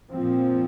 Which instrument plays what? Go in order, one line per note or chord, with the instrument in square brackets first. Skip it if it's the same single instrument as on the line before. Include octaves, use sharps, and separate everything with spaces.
[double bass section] A#2 F3 C4